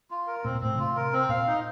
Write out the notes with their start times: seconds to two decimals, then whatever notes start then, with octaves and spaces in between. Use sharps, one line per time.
0.11 F4
0.27 A#4
0.44 A#2 C4
0.55 A#2
0.61 A2 C4
0.75 D3
0.78 C3 F4
0.96 A#4
1.13 C4
1.29 A#2 F5
1.47 D#4